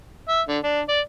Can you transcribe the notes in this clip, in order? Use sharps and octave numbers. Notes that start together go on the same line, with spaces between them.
E5
D3
D4
D5